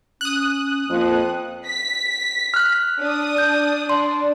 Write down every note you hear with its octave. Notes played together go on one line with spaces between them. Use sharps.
C#4 D#6 F#6
F2 A#3
B6
F6 F#6
D4 D#6
G6
D4 C6